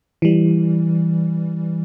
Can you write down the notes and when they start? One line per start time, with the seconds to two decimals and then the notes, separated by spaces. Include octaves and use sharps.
0.22 E3 G3